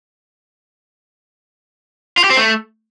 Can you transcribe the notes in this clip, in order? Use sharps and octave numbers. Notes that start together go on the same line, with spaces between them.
F4
G4
C4
A3